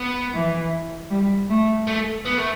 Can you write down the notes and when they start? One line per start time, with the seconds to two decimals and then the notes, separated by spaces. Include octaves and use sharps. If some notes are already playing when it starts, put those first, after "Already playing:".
Already playing: B3
0.34 E3
1.11 G3
1.50 A3
1.87 A3
2.26 B3
2.38 A3